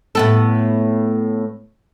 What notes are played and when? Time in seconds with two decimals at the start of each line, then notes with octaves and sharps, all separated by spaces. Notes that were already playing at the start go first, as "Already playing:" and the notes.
0.15 A2 B3 A4